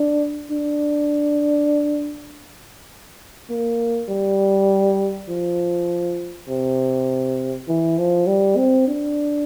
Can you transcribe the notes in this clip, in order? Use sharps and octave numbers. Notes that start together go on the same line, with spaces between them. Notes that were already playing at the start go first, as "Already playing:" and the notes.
Already playing: D4
D4
A#3
G3
F3
C3
E3
F3
G3
C4
D4